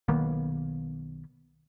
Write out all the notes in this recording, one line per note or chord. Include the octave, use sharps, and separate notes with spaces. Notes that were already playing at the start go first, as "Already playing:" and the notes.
B1 D#3 A#3 B3